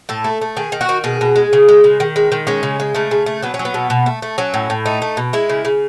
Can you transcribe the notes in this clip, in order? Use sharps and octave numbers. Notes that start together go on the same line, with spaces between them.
A2 A4
A3
A3
D#3 G#4
D#3
F#4
D#3
B2 G#4
B2
G#3
C#3
G#3
C#3
D#3
G#3
D#3
G#3 C#4
C#3
G#3
C#3 A3
C#3
A3
F#3 B3
C#4
F#3
B3
B2
B2
A3
A3
F#3 C#4
A2
A2
A3 D#4
A3
B2
G#3 E4
C#3
C#3